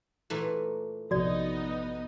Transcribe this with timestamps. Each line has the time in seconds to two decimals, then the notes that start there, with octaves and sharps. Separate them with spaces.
0.30 A#2 E3 A3
1.11 A#1 C3 F3 B3 D#4 F#4 D5 D#5